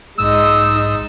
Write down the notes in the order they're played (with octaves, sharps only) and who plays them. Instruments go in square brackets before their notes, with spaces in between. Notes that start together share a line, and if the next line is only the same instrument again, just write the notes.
[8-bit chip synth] B1 G#2 D#6 [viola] G#3 D#4 [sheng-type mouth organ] E6